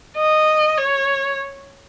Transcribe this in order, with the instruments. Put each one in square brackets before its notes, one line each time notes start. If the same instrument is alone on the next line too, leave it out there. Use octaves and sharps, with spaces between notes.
[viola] D#5
C#5